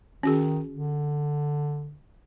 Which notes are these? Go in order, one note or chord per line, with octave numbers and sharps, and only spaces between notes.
D#3 C#4 F#4 G#4
D3